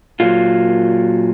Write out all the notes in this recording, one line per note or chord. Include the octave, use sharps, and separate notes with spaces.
A#2 F#3 F4